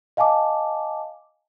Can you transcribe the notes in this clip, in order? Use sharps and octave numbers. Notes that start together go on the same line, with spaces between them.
D#5 F5 G#5 A5 D6